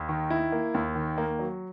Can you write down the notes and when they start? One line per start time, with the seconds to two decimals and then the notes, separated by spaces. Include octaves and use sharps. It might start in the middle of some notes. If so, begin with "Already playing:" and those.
Already playing: D#2
0.09 D#3
0.30 E4
0.52 A#3
0.74 D#2
0.95 D#3
1.18 A#3
1.39 F#3